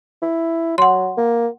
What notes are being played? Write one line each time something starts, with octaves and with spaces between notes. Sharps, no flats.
E4
F#3 F#5 C6
A#3